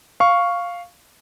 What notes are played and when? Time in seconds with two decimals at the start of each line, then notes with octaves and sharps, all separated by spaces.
0.20 F5 C#6